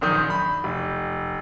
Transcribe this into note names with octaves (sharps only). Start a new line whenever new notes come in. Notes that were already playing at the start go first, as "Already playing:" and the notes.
A#1 F#2 D#3 D#6 G6
B5
F1